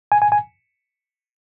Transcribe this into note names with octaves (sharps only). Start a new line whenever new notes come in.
G#5
G#5
G#5